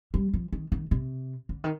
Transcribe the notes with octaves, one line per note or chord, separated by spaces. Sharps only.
G3
F3
D#3
D#3
C3
D3
D#3